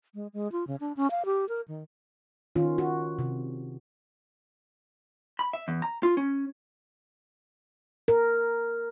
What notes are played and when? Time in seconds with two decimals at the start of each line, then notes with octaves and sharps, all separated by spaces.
0.15 G#3
0.33 G#3
0.52 F4
0.67 C#3
0.80 D4
0.97 C#4
1.11 F5
1.25 G4
1.49 A#4
1.68 D#3
2.56 D#3 C#4 F4
2.78 F#4
3.19 C3
5.39 B5
5.53 E5
5.68 E2
5.82 A#5
6.03 F4
6.17 C#4
8.08 A#4